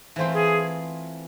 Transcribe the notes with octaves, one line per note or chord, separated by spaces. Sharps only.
E3 A3 C4 F4 C5
G#4